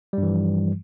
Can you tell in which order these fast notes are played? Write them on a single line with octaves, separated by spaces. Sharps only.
G3 G2 E3 F3